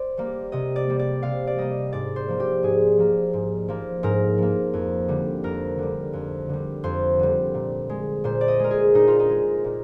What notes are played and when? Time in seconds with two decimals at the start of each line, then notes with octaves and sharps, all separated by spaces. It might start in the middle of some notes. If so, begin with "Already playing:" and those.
Already playing: C5 D5
0.18 G3 A#3
0.52 C3 D#5
0.76 D5
0.88 G3 A#3
0.99 D5
1.22 C3 F5
1.47 D5
1.58 G3 A#3 D#5
1.93 G#2 D5
2.16 C5
2.28 F3 A#3
2.40 G4
2.63 G#2 G#4
2.98 F3 A#3
3.33 G#2
3.68 F3 A#3
4.03 G#2 A#4
4.38 F3 A#3
4.73 F2
5.08 D3 G3
5.44 F2 A#4
5.78 D3 G3
6.13 F2
6.49 D3 G3
6.84 F2 C5
7.19 D3 G3
7.54 A#2
7.90 G#3
8.24 A#2 C5
8.41 D5
8.48 D#5
8.60 G#3 A#4
8.71 G#4
8.94 A#2 D#4
9.07 F4
9.20 D#4
9.30 G#3
9.64 A#2